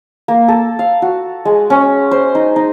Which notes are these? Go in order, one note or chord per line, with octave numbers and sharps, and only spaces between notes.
A#3
A4
F5
F#4
G#3
C#4
C5
D#4
D#4